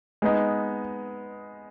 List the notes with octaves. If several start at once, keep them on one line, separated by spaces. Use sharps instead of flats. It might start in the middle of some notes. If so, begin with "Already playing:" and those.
G#3 B3 D#4